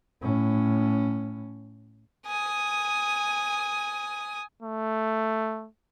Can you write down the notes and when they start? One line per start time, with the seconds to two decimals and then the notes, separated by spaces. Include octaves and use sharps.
0.22 A2 C#4
2.27 G#5 D#6
4.63 A3